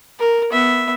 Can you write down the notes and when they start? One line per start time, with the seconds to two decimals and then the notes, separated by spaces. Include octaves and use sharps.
0.20 A#4
0.51 B3 E5